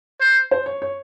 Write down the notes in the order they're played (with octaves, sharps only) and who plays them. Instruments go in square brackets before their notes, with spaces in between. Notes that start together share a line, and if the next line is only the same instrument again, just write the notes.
[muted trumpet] C5
[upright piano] C5
C#5
C#5